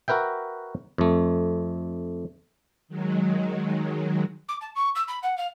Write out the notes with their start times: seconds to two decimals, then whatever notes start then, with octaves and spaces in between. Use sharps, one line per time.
0.08 F#4 A#4 B4 E5 G5
0.98 F2 A3
2.88 D#3 F#3 G#3
4.48 D6
4.61 A5
4.75 C#6
4.95 E6
5.07 B5
5.22 F#5
5.37 F5